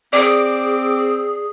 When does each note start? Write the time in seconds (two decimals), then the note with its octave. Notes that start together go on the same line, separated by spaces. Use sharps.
0.13 C4 G#4 D5 D6